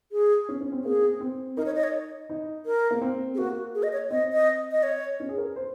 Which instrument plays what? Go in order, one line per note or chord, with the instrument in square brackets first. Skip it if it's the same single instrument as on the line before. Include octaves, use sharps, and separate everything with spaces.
[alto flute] G#4
[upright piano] C#4
C#4
C4
[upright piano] A#3 [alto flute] G#4
[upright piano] C4
C4
[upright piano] D#4 [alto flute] A#4
[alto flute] C#5
D#5
C#5
[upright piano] D#4
[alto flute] A#4
[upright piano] A#3
C4
[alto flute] G#4
[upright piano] A#3 [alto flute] F#4
[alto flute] G#4
D#5
C#5
[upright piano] C4 [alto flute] D#5
[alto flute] D#5
D#5
C#5
[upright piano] C#4
G#4
A#4
C5